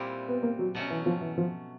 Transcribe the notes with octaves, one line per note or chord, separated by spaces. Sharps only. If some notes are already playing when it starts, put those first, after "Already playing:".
Already playing: A#2 G3 C4 E4 G4
B3
A#3
F#3
B2 F#3 A3 C#4
E3
F3
E3
F3